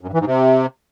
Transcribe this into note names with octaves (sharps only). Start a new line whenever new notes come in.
F#2
G2
E3
G#2
C3